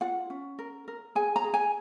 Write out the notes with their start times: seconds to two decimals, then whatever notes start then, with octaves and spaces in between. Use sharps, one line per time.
0.01 F4 F#5
0.30 C#4
0.59 A#4
0.88 A#4
1.15 G#4 G#5
1.36 A#5
1.44 G#4
1.54 G#5